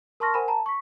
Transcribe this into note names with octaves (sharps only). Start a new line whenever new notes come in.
A#4 A5 C6 C#6 F6 A#6
A#4 C5 F#5 G#5 B5
A5 A#5
C#6 B6